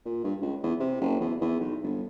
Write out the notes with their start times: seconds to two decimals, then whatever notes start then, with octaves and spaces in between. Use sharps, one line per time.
0.05 A#2
0.24 G2
0.42 C#2
0.63 E2
0.80 C3
1.01 F#1
1.20 E2
1.41 E2
1.60 B1
1.83 G1